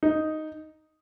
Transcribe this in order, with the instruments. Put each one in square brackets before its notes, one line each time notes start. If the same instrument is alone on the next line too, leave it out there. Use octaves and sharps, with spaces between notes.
[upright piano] D#4